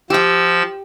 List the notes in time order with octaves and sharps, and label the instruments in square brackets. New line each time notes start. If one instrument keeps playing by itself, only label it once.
[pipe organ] F3 E6 [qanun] G4 G5